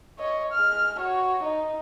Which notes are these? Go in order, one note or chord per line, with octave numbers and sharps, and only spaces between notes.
C#5 D#5
G#3 F6
F#4 C#5
D#4